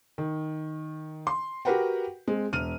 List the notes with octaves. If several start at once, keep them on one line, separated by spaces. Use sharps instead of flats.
D#3
C6
F#4 G4 A#4 B4 F#5 G5
G#3 C4
E1 F6 D#7